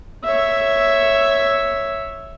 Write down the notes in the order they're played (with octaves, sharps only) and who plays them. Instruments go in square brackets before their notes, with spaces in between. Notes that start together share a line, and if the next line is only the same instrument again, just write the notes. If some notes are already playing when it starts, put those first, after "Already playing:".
[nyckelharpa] C#5 E5